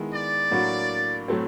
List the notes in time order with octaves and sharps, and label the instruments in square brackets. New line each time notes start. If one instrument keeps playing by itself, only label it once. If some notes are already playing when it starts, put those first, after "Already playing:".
Already playing: [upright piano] D#3 G#3 B3 E4
[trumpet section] D5
[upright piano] A2 F#3 A#3 D4 F#4
A2 F#3 A3 C4